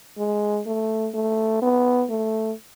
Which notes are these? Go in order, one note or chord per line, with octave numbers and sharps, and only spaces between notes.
G#3
A3
A3
B3
A3